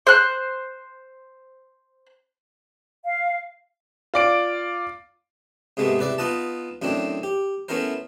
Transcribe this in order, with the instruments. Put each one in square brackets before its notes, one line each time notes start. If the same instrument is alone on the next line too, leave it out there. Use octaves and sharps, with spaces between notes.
[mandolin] C5 F#6
[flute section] F5
[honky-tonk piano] F4 D5 D7
[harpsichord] G#2 C3 G#3 A3 B3
C2 B4 D5 E5
B3 D#4 F4 B4 D#5 A5
F#2 A2 D#3 C4 D4
G4
A3 B3 C#4 E4 A#4 C5